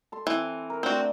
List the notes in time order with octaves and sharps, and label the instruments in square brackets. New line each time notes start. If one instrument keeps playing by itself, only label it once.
[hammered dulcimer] A4 C6
[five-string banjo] E3 [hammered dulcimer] C4
[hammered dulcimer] A#4
[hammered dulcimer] A3 D4 D5 [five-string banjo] C4 F#4